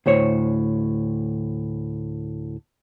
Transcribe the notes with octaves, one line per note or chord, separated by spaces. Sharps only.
D2 A2 C5 C#5